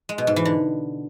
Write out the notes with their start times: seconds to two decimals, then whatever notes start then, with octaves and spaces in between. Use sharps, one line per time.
0.09 G#3
0.18 B2
0.27 G#2
0.36 E3
0.45 D3